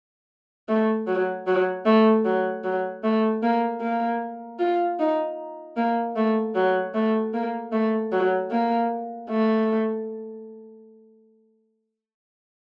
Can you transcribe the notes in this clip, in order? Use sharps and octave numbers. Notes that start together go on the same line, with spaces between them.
A3
F#3
F#3
A3
F#3
F#3
A3
A#3
A#3
F4
D#4
A#3
A3
F#3
A3
A#3
A3
F#3
A#3
A3